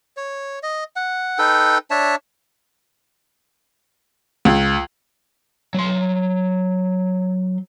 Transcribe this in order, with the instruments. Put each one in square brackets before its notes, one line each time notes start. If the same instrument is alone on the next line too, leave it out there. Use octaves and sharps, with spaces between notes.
[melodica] C#5
D#5
F#5
D#4 A4 B4 G5
D4 C#5 E5 A5
[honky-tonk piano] C#2
[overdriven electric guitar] F#3 C6